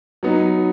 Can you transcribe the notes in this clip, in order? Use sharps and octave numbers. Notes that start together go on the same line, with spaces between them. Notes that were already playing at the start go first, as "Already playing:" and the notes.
F#3 B3 D#4